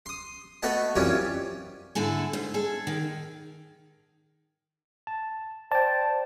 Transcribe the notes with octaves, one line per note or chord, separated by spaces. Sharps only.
C6 D#6
A3 B3 F#4 D#5 A5
F#2 C3 E3 G3 C#4 F4
G#2 D3 E4 A4 G#5
G#2
G#4 A4
D#3
A5
C5 D5 G5 A5